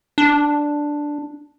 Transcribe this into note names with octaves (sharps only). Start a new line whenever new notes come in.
D4